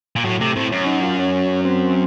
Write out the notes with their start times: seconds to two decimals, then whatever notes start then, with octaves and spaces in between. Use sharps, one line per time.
0.16 A#2
0.24 A2 F#3
0.40 C3 A3
0.56 A2 C4
0.71 F#2 C#4
0.87 D#4
1.03 F4
1.19 C#4
1.65 C4